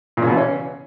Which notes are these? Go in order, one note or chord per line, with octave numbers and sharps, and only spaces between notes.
A#2
C#3
B2
E3
C#4